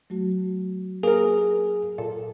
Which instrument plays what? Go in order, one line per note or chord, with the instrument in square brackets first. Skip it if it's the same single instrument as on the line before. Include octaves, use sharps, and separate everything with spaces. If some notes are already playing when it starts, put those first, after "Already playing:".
[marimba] F#3 A3 F#4
[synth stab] A#3 A#4 [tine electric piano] G#4
[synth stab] A#2 A4